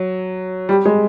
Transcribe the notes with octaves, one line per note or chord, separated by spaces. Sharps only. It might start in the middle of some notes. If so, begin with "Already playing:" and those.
Already playing: F#3
G3
G#3